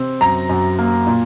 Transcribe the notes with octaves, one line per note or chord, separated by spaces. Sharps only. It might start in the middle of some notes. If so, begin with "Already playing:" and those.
Already playing: C3 C4
F#2 A#5
F#2
A#3
A#2